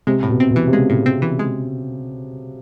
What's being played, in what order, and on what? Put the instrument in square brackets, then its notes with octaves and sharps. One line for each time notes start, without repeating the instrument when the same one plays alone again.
[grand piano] C3 [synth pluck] G#3
[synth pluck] A2
[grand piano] B2
[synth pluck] C4
[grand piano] B2
[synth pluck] E3
[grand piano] C3
[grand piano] C#3 [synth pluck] G#3
[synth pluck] A2
C4
E3
G#3